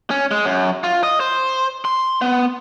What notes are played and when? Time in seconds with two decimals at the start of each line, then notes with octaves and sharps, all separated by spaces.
0.10 C#4
0.31 G#3
0.45 F#2
0.84 F4
1.03 D#5
1.20 C5
1.85 C6
2.21 B3